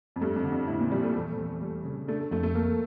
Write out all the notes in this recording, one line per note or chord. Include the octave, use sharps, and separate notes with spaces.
F2
G2 A3
F2
D3
F2
A2 E4
A#2
F3 G3
A3
E2
E2
G3
C#3
A3 D4
A3
F2 A3
A3
A#3